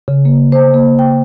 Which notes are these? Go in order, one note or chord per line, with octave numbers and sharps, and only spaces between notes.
C#3
A#3
C5
A#3
G5